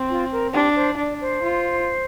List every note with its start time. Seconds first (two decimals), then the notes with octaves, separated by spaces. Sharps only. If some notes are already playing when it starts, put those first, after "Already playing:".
Already playing: C4
0.09 F4
0.32 A#4
0.53 D4 G4
0.75 C5
0.97 D4 D5
1.20 C5
1.43 F4